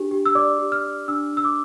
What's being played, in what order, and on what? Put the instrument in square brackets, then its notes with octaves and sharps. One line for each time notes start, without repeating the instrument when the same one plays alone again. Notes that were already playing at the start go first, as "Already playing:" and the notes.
Already playing: [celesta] D4 G4
G4
E6
D5 D6
G4
F6
D5
D4 E6
D4 E6
D6